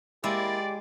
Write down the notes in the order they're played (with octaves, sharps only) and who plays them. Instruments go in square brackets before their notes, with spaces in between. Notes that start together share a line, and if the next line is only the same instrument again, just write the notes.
[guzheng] G#3 [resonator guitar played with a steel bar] A#3 E4 [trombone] G4 [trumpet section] D5